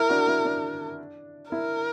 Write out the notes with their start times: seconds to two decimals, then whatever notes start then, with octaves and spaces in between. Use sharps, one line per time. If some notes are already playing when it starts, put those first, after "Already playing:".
Already playing: E4 A#4
0.09 D4 F#4
0.28 E4
0.45 D4
1.51 E4 A#4